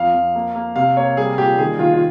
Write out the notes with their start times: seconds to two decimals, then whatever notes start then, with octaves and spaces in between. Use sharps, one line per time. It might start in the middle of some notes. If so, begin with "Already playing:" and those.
Already playing: F2 F5
0.14 F2
0.35 A#3
0.55 A#3
0.76 C3 F5
0.96 A#3 C#5
1.17 G3 G#4
1.38 A#2 G4
1.58 D#3 G#4
1.79 D#3 F4
1.94 F4